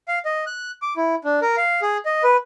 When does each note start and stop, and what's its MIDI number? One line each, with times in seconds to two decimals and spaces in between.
0.08 0.19 77
0.25 0.45 75
0.46 0.71 90
0.82 0.94 86
0.96 1.15 64
1.24 1.40 62
1.42 1.56 70
1.57 1.81 77
1.82 1.97 68
2.05 2.23 75
2.23 2.37 71